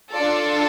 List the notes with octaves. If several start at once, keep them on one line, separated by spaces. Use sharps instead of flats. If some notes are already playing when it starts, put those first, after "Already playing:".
D4 F4 A4 D5